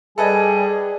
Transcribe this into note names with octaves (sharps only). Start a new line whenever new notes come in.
G3 G#4 A4 B4 D#5 G#5